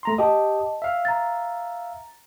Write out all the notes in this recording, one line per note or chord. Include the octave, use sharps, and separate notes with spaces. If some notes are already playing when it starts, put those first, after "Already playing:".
A3 A#5 C6
G4 D#5 A5 D#6
E5 F5
A#5 A6